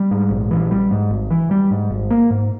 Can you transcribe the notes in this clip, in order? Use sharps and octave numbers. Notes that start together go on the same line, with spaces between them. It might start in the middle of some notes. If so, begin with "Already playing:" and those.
Already playing: G3
G#2
A#1
E3
G3
G#2
G#1
E3
G3
G#2
G#1
A#3
G#2